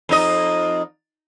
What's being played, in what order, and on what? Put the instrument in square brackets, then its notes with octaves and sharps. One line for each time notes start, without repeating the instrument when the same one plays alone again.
[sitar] F2 D#4 D#5